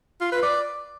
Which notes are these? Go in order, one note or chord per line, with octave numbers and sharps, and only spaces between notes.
F4
B4
D5